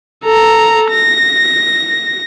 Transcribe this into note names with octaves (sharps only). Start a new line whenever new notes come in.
A4 A#5
A#6